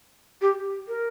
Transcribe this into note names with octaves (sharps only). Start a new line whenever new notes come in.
G4
A#4